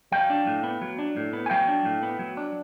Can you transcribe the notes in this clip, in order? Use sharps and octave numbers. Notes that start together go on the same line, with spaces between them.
F#3 F5 G5
D4
A2
B3
F#3
D4
A2
B3
G#5
F#3 F5 G5
D4
A2
B3
F#3
D4